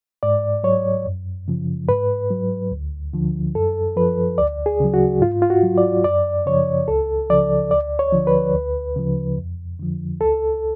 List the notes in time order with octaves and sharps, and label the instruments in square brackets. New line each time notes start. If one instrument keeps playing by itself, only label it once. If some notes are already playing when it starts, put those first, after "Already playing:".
[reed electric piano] G#2 D5
F#3 C#5
F#2
C#3 F3
G#2 B4
F#3
D2
D3 F3
F#2 A4
F3 B4
D2 D5
G#4
C#3 F#3
F#4
G#2 F4
F4
F#4
F#3
D5
F#2 D5
C#3 F3 C#5
C#2 A4
C#3 F3 D5
D2 D5
C#5
D3 F3
B4
D2
C#3 F3
F2
D3 F3
C#2 A4